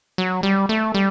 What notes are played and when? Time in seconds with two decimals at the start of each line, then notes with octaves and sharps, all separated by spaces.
0.18 F#3
0.43 G3
0.69 A3
0.94 G3